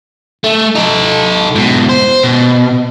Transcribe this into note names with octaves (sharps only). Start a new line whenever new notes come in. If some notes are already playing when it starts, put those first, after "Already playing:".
A3
D#4 A4
G#2 B2
C5
B2